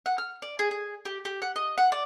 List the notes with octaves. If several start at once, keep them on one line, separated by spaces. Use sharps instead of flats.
F#5
F6
D5
G#4
G#4
G4
G4
F#5
D#5
F#5
D5